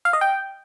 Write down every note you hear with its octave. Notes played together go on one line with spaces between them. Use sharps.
F5
D#5
G5